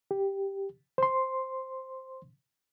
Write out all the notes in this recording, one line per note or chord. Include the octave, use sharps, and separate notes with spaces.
G4
C5 C6